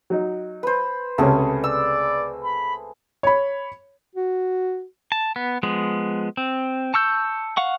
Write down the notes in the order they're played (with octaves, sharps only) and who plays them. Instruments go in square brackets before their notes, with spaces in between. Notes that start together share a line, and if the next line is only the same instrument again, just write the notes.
[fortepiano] F#3 D#4
[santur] B4 C5
[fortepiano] C#2 C3 C#4 [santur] A3 G#4
[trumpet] D5 [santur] E6
[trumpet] B5
[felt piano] C#5 B5
[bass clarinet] F#4
[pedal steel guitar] A5
B3
F3 G#3 B3
C4
A5 C#6 E6 G6
F5 F#5 C#6